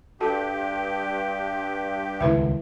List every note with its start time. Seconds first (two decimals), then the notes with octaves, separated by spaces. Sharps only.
0.21 G2 F#4 G4 A4 A5
2.21 D#1 C#2 A2 E4 B4 E5